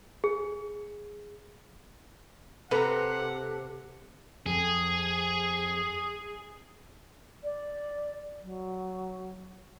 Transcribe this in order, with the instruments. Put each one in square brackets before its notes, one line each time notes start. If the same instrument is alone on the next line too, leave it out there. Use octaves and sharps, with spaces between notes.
[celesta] G#4
[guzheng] C3 [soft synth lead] A4 [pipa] B4 A#5 [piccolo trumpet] F#5
[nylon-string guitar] F2 [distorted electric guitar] G#4
[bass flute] D5
F#3